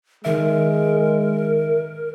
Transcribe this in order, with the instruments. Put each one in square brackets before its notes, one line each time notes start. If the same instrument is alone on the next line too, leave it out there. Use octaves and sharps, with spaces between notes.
[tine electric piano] D#3 E5 [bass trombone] G#3 [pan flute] A#4